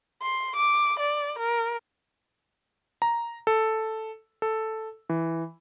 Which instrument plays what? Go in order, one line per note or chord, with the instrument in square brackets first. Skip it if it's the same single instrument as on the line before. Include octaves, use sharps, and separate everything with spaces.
[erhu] C6
D6
D5
A#4
[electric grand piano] A#5
A4
A4
E3